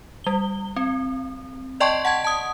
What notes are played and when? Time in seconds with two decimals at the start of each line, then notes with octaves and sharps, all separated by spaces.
0.24 G3 G7
0.76 C4
1.80 D5 D#5 G5 A5 C6 C#6
2.05 F#5 A5 G#6
2.24 A5 D#6